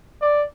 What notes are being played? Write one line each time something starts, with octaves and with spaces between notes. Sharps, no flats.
D5